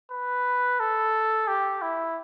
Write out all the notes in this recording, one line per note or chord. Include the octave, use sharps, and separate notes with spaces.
B4
A4
G4
E4